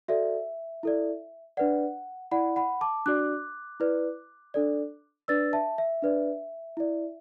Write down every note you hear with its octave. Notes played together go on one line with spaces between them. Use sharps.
F#4 A4 D5 E5
E4 A4 D5
D4 B4 D5 F#5
E4 D5 F#5 B5
F#5 B5
A5 D6
D4 F#4 D5 D6 F#6
E4 B4 D5
D4 A4 D5
D4 B4 D5 E6 A6
E5 A5
E5
D4 B4 D5
E4 D5